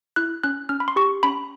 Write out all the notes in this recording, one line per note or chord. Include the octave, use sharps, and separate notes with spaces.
E4 F#6
C#4 F#6
C#4 F6
B5
C6
G4 C#6
C#4 B5